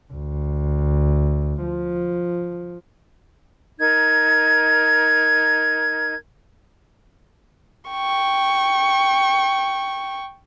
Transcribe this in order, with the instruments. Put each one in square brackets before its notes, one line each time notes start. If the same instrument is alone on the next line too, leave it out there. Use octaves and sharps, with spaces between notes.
[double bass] D2
F3
[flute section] D#4 A#4 G#6
[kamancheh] G5 C#6